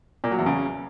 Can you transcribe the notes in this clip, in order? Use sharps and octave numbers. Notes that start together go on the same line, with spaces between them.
A#2
F#3
E2
C#3